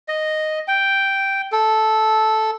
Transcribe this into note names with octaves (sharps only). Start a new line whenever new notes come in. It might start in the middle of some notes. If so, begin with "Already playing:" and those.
D#5
G5
A4